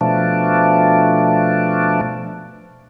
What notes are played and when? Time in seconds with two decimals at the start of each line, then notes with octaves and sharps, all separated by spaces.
0.01 B2 F3 A3 D4